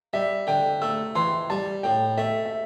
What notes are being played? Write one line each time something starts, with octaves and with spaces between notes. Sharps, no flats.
G3 E5
D3 G5
A3 E6
E3 C6
G3 A5
A2 G5
A3 E5
E5